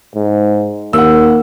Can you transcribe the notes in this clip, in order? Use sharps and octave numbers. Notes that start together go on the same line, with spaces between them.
G#2
D#2 A#3 F#5 E6